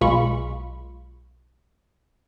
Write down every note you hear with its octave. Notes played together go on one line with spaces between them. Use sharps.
B1 B2 G#3 F4 B5 C#6